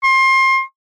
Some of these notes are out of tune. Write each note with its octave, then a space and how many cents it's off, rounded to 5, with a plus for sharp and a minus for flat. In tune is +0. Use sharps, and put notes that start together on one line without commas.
C6 +30